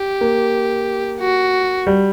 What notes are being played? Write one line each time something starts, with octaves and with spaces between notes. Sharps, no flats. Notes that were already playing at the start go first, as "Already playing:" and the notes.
Already playing: G4
A#3
F#4
G3